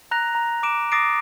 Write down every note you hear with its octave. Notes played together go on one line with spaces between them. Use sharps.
A#5 F#6 A#6 F7
A#5
D6 D7 E7
D6 D#6 A6 A#6 C7 D7